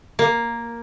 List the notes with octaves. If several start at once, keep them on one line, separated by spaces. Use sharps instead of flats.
A#3